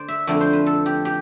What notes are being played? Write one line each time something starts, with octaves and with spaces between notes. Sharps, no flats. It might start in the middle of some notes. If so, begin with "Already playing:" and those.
Already playing: D3 C5 D5
E5
F2 D3 A3 D5
C5
B4
A4
G4
G4